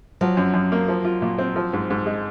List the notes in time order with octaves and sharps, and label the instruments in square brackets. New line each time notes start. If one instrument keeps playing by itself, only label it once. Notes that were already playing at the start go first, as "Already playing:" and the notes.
[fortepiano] F3 [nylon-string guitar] F#3
[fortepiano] F#2
F#2
A#3
F3
F4
A#2
C4
F3
G#2
G#2
G#3